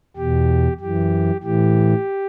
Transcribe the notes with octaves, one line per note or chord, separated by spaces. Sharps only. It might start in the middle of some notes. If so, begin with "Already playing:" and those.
E2 B2 G4
F#2 E3 G4
A2 E3 G4